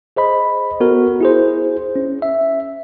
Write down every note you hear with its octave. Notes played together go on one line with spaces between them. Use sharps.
G#4 C5 D#5 B5
B3 F#4 A4 A#4
E4 G#4 C5
C#4
E5